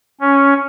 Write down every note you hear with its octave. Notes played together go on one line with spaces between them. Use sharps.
C#4